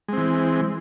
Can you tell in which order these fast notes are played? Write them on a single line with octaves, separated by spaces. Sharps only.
G#3 C4 E3